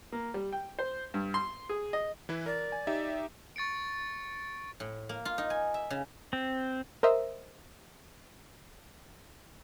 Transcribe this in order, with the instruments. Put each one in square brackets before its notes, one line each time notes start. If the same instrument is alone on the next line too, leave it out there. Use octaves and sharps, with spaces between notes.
[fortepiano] A#3
G3
G5
C5
G2
C6
G#4
D#5
[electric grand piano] E3 E4 B4
[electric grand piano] A#4 [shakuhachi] D5
[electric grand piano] G#5
D#4 G4 E5
[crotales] C#6 A6 C#7 D7
[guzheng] A2
A#3
F4
D#4
G#5
E5
C#3
[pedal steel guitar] C4
[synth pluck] A#4 C5 D#5 E5